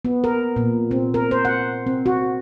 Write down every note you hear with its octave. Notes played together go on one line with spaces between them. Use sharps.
B3
A#4
A#2
C4
A#4
C5
F#5
C4
F#4